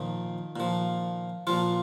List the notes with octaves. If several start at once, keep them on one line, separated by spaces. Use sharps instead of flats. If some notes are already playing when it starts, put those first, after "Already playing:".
Already playing: A#2 D#3 F3 D#4
A#2 F3
A#2 F3 F4